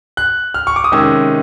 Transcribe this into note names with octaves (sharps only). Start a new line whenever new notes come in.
F#6
F6
C#6
D6
D#6
C3 D#3 G#3 C#4 E6